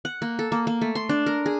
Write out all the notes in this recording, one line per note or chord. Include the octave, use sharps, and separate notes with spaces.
F#5
A#3
A4
A#3
A#3
A3
C6
D4
A#4
G#4